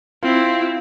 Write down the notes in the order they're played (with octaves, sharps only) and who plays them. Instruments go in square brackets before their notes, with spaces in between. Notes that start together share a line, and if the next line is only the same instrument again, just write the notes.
[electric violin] C4 E4 [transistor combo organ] F4